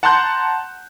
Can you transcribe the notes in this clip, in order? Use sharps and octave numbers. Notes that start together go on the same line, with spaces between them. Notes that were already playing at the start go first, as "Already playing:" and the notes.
F#5 A5 A#5 C6 F#6 G6